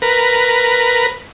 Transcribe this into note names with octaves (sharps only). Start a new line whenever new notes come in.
A#4 B4